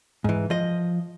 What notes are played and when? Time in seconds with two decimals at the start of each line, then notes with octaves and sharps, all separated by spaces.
0.24 G#2 E3
0.50 F3 D#5